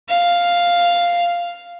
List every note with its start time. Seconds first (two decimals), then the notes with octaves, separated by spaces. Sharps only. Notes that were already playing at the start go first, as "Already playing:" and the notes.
0.09 F5